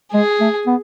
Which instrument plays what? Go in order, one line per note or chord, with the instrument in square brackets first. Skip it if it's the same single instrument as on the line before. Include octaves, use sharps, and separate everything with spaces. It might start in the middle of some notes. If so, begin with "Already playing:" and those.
[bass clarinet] G#3 [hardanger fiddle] G#4
[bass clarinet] A3
B3